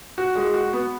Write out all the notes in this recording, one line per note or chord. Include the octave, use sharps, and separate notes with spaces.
F#4
G#3
F#4
B3